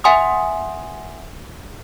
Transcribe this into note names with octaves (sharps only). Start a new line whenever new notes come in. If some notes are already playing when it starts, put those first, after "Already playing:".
E5 F#5 G#5 C6 D#6